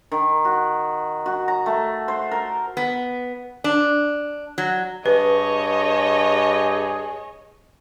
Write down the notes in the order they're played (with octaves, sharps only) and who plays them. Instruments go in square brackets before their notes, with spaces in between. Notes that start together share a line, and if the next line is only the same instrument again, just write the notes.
[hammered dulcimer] D#3
F#4
F#4
A#5
A3
C5
A#4
[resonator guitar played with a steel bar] B3
D4
F#3
[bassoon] G2 [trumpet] G#4 [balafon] B4 [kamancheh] C#5 D#5